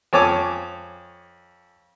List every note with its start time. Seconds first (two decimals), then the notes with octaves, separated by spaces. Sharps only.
0.13 F2 C#5 G#5 D6